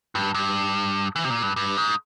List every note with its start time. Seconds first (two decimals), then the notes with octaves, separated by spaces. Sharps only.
0.15 G2
0.34 G2
1.16 E3
1.24 C3
1.30 A#2
1.43 G2
1.56 G2
1.77 G#2